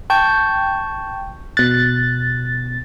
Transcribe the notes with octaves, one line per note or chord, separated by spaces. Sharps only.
G5 A5 C#6 G6
B2 F#6 A6